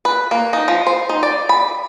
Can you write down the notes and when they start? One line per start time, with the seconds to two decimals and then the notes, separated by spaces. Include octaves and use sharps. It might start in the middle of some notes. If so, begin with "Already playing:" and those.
0.05 B4
0.31 A#3
0.53 D#4
0.68 F3
0.87 C5
1.09 D#4
1.23 D5
1.49 B5